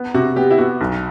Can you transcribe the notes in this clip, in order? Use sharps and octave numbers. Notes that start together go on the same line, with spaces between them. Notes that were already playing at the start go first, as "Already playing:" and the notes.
Already playing: B3
C3 F#4
B3 G4
E4
B3 F#4
B1